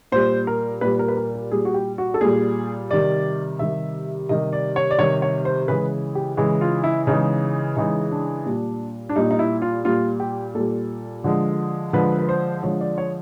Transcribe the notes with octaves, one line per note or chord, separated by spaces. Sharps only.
A#2 G3 C5
A#4
A#2 G3 B4
A#4
B4
A#4
A#4
A#2 G3 G#4
F#4
G4
F#4
A4
A#2 G3 G#4
C3 D#3 G3 D5
C3 D#3 G3 E5
C3 D#3 G3 D#5
D5
C#5
D5
C3 D#3 G3 C#5
C#5
C5
C#3 E3 G#3 B4
G4
C#3 E3 G#3
F4
E4
C#3 E3 G#3 D#4
C#3 E3 G#3 D#4
D4
A#2 G3
D4
A#2 G3 D#4
D#4
E4
F4
A#2 G3 F4
G4
A#2 G3 A4
D3 F3 G#3
D3 F3 G#3 B4
B4
C5
D3 F3 G#3 C#5
D5
C#5